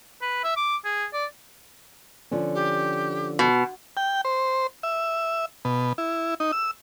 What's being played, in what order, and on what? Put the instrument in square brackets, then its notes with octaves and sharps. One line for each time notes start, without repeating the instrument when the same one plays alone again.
[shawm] B4
E5
D6
G#4
D5
[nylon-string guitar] D3 F3 C#4
[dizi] G4
[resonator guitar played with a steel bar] B2
[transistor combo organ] G5
C5
E5
B2
E4
D#4
E6